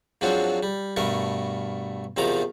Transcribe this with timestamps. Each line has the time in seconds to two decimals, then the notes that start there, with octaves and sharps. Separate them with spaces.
0.21 G#2 F3 F#3 C4 D4 F#4
0.63 G3
0.96 G2 B2 A3 A#4 C#6
2.17 E2 C3 D#3 F3 A#5 D6